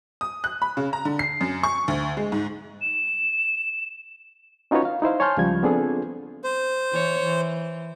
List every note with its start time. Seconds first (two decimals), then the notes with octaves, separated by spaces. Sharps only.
0.21 D#6
0.44 F#6
0.62 B5
0.77 C#3
0.93 A#5
1.05 D3
1.19 C7
1.41 F#2
1.63 C#6
1.88 D2
2.17 G#3
2.32 G#2
2.81 E7
4.71 C#4 D#4 F4 F#4 B4 C#5
4.85 F5
5.02 D#4 E4 C5 F5
5.20 C#5 G#5 A5 C6 F6 G6
5.37 C#2 C#3 F3 G3 G#6
5.63 B3 C4 D4 F4 G#4 A4
6.44 C5
6.92 E3 C#5
7.23 E3